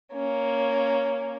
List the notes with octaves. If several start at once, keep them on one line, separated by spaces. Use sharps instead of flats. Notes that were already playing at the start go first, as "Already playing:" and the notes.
A#3 C#4